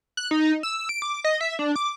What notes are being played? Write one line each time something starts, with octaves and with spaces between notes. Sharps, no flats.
F#6
D#4
E6
D7
D6
D#5
E5
D4
D6